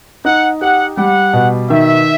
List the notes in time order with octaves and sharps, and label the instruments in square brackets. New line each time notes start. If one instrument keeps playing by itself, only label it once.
[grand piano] D#4 [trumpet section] F#5
[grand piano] G4 [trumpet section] F#5
[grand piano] G3 [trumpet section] F#5
[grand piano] B2
[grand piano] D#3 [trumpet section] E5